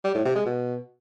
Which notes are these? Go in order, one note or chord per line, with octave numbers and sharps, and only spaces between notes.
G3
A2
C3
G#3
B2